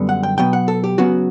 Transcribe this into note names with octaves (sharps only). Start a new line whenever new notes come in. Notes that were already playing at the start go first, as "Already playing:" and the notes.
Already playing: F#2 D3 G3 B3
F#5
G5
B2 F#3 B3 G5
F#5
A4
G4
C#3 F#3 B3 F#4